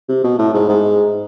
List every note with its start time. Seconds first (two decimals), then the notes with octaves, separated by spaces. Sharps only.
0.09 C3
0.24 B2
0.38 A2
0.54 G#2
0.69 G#2